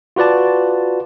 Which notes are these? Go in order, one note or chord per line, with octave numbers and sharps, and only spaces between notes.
F4 F#4 B4 D5 A5